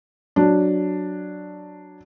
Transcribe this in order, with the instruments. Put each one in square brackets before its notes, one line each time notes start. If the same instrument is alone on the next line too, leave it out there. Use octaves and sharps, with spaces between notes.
[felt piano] F#3 D4